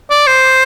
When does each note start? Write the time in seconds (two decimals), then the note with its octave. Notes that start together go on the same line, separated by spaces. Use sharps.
0.10 D5
0.27 C5